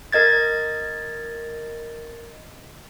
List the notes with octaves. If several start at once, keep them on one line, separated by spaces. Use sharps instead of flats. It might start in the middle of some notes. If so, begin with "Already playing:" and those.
A#4 D#5 G#6 A6